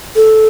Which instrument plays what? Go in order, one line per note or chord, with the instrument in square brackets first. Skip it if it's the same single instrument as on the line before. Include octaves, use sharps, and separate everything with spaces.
[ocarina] A4